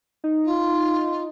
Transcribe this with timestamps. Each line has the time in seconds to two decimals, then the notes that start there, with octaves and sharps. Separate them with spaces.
0.24 D#4
0.44 F4